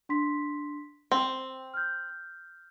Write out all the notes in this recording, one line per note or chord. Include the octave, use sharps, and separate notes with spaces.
D4 C6 B6
C4 G5
F6 G6